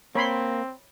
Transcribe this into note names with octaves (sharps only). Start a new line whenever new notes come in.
A#3 C4 C#5 B5 C6